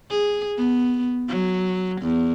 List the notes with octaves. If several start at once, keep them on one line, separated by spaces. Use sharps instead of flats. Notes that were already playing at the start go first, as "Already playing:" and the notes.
G#4
B3
F#3
E2